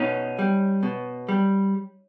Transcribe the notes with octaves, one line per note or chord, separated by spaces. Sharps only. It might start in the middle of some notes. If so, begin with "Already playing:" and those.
Already playing: B2 C#4 D#4
G3
B2
G3